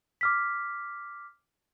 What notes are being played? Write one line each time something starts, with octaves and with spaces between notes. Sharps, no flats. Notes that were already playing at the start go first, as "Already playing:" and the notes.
D6 F6 B6